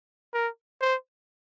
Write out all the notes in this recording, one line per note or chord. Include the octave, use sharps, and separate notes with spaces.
A#4
C5